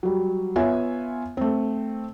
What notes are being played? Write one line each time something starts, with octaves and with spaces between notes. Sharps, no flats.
F#3 G3
B3 F4 C#5 E5 G#5
A3 C4